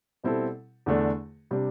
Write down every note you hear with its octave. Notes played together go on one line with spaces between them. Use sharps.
B2 G3 C4 E4 A4
E2 D3 A3 D4
C3 G3 D4